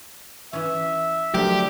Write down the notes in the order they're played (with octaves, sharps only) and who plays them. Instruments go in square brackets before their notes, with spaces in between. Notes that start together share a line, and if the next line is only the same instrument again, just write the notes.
[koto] E3 C#4 [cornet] E5
[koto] D3 F3 A#3 [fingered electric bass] F#3 A3 [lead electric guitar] G4